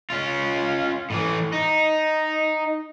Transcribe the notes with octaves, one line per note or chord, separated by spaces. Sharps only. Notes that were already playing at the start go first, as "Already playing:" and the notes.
C#4 F4
A2 E3
D#4